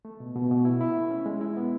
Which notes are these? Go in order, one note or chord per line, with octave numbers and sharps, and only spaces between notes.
A3
B2
B2
B2
E4
E4
A3
C#4
G#3
E4
B3